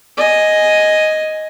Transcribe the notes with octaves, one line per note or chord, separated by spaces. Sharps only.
D#5 G#5